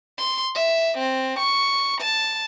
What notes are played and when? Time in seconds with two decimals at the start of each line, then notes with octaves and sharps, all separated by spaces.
0.18 C6
0.55 E5
0.98 C4
1.39 C#6
2.01 A5